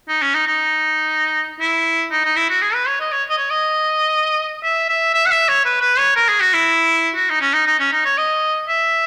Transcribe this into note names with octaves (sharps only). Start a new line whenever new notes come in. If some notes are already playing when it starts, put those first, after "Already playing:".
D#4
C#4
D#4
D#4
E4
D#4
D#4
E4
F#4
G#4
B4
C#5
D#5
C#5
D#5
C#5
D#5
E5
E5
E5
F#5
E5
C#5
B4
B4
C#5
A#4
G#4
F#4
E4
F#4
D#4
C#4
D#4
D#4
C#4
D#4
C#5
D#5
E5